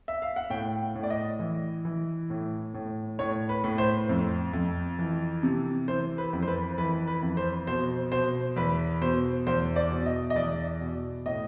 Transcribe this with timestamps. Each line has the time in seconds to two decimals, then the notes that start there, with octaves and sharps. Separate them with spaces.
0.08 E5
0.22 F5
0.36 F#5
0.50 A2 G5
0.95 A2
1.03 D5
1.10 D#5
1.39 E3
1.85 E3
2.30 A2
2.74 A2
3.19 A2 C#5
3.49 B4
3.64 A2
3.78 C5
4.09 F2
4.53 F2
4.99 E3
5.43 C3
5.88 E3 C5
6.18 B4
6.33 F2
6.42 C5
6.48 B4
6.78 E3 B4
7.07 B4
7.22 F2
7.37 C5
7.67 B2 C5
8.12 B2 C5
8.56 E2 B4
9.01 B2 C5
9.47 E2 C5
9.76 D5
9.91 B2
10.06 D#5
10.30 D#5
10.36 E2 D5
10.81 B2
11.26 A2 D#5